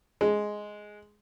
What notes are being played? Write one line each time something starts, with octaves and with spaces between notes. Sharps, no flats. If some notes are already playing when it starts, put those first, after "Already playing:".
G#3